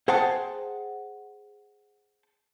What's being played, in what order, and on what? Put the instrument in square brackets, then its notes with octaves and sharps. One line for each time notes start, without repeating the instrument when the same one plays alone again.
[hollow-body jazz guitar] G#4 C5 F#5 G5 A5